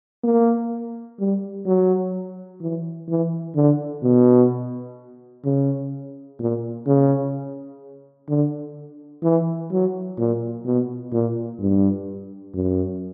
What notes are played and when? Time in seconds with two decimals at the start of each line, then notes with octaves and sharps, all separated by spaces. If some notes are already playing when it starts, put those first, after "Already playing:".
0.23 A#3
1.19 G3
1.65 F#3
2.61 E3
3.08 E3
3.55 D3
4.03 B2
5.45 C#3
6.39 A#2
6.86 C#3
8.29 D3
9.23 E3
9.71 F#3
10.18 A#2
10.65 B2
11.12 A#2
11.60 G2
12.54 F#2